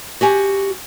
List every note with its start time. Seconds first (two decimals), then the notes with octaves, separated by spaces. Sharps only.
0.21 F#4 G4 G#5